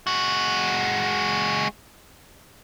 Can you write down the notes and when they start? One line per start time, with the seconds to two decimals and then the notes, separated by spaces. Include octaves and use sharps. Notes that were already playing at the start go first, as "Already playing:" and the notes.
0.07 G#3 F#4